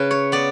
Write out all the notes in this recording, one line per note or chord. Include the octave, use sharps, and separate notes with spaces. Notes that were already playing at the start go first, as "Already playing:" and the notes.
Already playing: C#3 B4
C#5
B3 D5